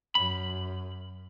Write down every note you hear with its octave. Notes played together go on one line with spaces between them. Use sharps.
F#2 B5